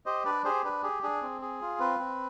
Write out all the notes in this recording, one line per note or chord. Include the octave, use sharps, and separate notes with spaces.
G4 C5 D#5
D4 B4 D5
G4 G#4 C5
D4 B4
G4 G#4
D4 G#4
C4
G#4
F4
C4 B4
C4